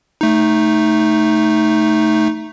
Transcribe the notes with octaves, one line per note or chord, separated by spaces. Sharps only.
A3 D#4